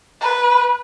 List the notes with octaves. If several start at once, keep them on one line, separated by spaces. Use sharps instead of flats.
B4